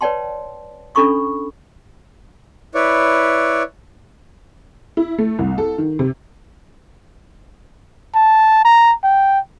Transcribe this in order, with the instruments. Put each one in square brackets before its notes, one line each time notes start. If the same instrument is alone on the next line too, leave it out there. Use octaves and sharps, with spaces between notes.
[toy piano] B4 C#5 D5 G5 A5 C6
C#4 D4 A4 B5 C#6 D#6
[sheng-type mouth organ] E4 B4 C#5 D5
[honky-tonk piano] E4
A3
C2
A4
D#3
C3
[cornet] A5
A#5
G5